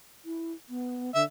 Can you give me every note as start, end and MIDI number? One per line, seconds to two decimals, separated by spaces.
0.25 0.53 64
0.69 1.11 59
1.15 1.24 50
1.15 1.23 76